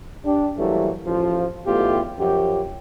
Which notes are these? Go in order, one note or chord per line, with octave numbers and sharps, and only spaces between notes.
D4 G4
E3 F#3 G3 A3 A#3 E4
A1 F3
B1 E2 A3 F4 G4
F#2 F3 G4